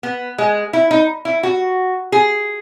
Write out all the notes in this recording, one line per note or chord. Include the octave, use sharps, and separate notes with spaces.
B3
G#3
E4
D#4
E4
F#4
G#4